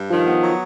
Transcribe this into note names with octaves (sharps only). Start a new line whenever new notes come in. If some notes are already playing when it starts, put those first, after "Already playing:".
Already playing: G2
D#3 F3
B3
F#3